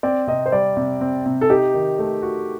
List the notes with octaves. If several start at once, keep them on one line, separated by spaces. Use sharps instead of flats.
C4 D5
C3 D#5
C5
G3 D5
C3
C4
C3
A4
D#4 G4
D#3
A3
F#4